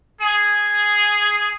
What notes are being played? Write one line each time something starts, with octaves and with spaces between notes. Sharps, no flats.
G#4